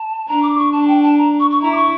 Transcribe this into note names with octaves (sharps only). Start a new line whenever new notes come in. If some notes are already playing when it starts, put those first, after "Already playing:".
Already playing: A5
D4 A#5
D6
C#6
D4 A5
G5
A5
A#5
C#6
C#6
E4 A#5
D6
C#6